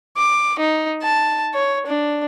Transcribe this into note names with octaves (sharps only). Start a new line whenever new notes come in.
D6
D#4
A5
C#5
D4